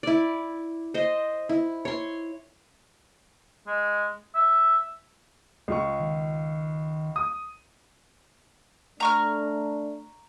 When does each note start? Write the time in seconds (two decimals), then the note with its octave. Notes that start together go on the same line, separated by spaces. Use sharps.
0.03 E4 D5
0.94 C5 D#5
1.49 E4
1.85 C#5 C6
3.67 G#3
4.35 E5
5.68 C#2 F4 C#6
6.00 D#3
7.16 D#6
9.00 A3 D4 A#5 C#6 F6